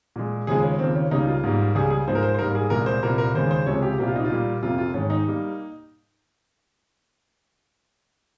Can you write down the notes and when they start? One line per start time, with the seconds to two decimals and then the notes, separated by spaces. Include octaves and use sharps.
0.16 A#2 G#3
0.47 D#2 C#3 F3 G#3 G#4
0.63 C#4
0.79 D#2 C#3 F3 A#3 C4
0.95 C#4
1.11 C#2 C#3 G3 A#3 D#4
1.27 F4
1.43 G#2 G3 A#3
1.75 C#2 C#3 G3 G#4
1.90 G#4
2.07 G#2 F3 G#3 C5
2.15 A#4
2.23 C5
2.35 C5
2.39 G#2 G3 A#3 A#4
2.55 G#4
2.70 C2 A#2 G#3 A#4
2.86 C5
3.03 C2 A#2 F3 A#4
3.18 A#4
3.34 D#2 C#3 G#3 C5
3.51 C5
3.66 C#2 C3 F3 G#3 C#5
3.82 G4
3.98 C2 A#2 F3 A#3 G4
4.08 F4
4.16 D#4
4.24 F4
4.30 A#2 G3 A#3
4.63 F2 C3 F3 A#3 F4
4.78 F4
4.94 G#2 D#3 G#3 C#4
5.10 D#4
5.27 G3 A#3